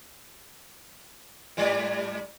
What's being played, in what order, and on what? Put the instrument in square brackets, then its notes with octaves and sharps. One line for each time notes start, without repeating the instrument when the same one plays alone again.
[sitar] G#2 G3 D5